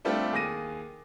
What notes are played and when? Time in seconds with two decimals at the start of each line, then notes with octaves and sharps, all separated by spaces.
0.05 G3 A3 C4 D4 F4 G4
0.32 D#2 G#4 D6 A#6 D#7